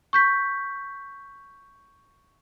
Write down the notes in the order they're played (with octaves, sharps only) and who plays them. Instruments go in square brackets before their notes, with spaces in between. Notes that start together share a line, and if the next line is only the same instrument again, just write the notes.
[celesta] C#6 G6 B6